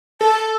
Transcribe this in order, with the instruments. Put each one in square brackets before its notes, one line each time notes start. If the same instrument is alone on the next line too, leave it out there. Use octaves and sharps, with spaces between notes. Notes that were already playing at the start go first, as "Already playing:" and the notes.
[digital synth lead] A4 [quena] A5